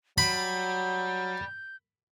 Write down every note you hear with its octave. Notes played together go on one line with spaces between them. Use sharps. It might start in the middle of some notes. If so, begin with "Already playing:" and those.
F#3 G3 B5 G6